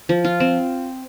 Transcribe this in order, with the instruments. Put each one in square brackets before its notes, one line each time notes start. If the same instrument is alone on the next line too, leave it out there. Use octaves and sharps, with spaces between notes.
[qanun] F3
F4
C4